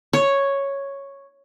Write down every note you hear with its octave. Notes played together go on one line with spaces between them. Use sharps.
C#5